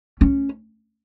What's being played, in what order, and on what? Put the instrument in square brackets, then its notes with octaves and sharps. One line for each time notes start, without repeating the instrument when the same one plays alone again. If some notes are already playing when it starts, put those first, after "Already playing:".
[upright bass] C#4